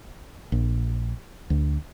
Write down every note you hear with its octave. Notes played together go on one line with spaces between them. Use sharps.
A#1
D2